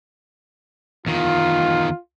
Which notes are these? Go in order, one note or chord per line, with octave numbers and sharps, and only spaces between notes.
E2 D#3 F4